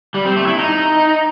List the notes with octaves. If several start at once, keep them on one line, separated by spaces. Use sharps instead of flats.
G3
C4
A3
E4
D#4